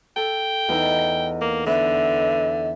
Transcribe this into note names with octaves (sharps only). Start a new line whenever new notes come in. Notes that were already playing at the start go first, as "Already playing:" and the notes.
A4 G5
E2 D#4 E4
A#3
D3 B3 E5